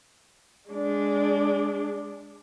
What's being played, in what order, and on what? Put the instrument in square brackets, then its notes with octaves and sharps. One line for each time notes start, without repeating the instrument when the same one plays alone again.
[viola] G#3 D4